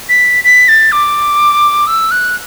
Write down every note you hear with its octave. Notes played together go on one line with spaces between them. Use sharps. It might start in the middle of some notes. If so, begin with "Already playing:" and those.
B6
B6
A6
D6
E6
F#6